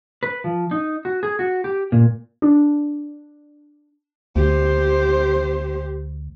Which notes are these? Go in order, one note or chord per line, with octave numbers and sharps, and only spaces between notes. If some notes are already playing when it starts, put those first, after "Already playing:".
B4
F3
D#4
F#4
G#4
F#4
G4
A#2
D4
D2 G4 C5